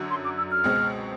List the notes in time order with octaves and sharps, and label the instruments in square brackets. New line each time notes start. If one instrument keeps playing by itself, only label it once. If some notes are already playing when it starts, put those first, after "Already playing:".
Already playing: [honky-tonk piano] F#2 D3 F#3
[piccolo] C6
D6
E6
F6
[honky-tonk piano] C#2 B2 G#3 C4